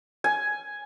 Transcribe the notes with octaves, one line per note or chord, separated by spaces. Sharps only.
G#5